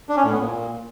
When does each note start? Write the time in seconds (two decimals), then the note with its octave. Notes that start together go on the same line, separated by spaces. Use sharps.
0.09 D4
0.16 C#4
0.24 A2
0.32 B3
0.39 A#2